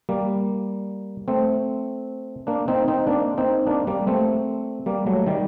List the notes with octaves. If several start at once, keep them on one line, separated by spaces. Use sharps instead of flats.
G3 A#3
A3 C4
A#3 D4
C4 D#4
C4 D#4
A#3 D4
C4 D#4
A#3 D4
G3 A#3
A3 C4
G3 A#3
F#3 A3
D#3 G3